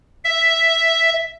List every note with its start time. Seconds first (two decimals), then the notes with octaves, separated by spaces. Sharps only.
0.25 E5